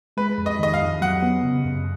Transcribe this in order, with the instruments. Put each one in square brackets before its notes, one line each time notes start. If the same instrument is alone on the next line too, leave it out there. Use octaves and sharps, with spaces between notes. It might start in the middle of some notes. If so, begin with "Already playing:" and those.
[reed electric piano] G#3 [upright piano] B4
[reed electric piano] F2
[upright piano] D#5
[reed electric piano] D#3 [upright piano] D#5
[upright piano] F5
[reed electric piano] F2
[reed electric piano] F#3 [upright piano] F#5
[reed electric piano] B3
C#3
F#2